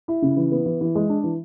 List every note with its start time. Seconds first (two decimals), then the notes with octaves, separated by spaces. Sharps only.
0.08 E4
0.22 C#3
0.37 E3
0.52 B3
0.66 E3
0.81 E3
0.95 G#3
1.09 D4
1.24 E3